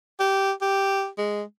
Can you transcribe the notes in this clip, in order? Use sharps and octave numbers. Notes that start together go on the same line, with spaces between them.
G4
G4
G#3